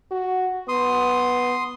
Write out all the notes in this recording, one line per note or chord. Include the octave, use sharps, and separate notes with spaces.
F#4
B3 C6 D#6